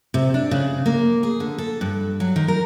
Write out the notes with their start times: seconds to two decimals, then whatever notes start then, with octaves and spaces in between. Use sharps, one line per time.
0.14 C3
0.34 D4
0.51 C#3
0.86 A#3
1.23 G#4
1.40 D3
1.58 A4
1.81 G2
2.20 F#3
2.36 D#3
2.48 A#4